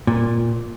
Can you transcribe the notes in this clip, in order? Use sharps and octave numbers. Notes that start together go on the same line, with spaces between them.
A#2